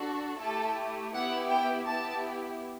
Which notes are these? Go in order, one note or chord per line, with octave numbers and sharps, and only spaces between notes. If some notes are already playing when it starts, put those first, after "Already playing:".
Already playing: D4 F#4 A4
A3 E4 G4 A4
B3 E4 G4 F#5
G5
B3 E4 G4 A5